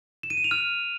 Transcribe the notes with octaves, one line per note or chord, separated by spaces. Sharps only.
E7
D#7
E7
F7
F6